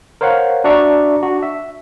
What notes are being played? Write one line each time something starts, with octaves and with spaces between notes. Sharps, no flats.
A#4 C5 C#5 F5 F#5
D4 F#4 D5 E5 A#5 C#6
D4 F#4
E5